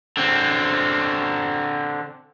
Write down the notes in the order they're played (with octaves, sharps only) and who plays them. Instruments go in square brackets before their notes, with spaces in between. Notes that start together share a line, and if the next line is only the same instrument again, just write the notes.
[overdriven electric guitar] D3 C4